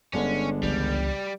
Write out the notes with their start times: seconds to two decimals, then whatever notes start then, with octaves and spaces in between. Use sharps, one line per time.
0.14 G1 D3 G#3 C#4 D4
0.63 C#2 E3 G3